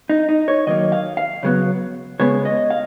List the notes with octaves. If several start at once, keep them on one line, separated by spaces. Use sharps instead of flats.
D#4
D#4
C#5
D#3 F#3 A#3 D#5
F5
F5
C#3 F#3 B3
C#3 G#3 B3 C#5
D#5
F5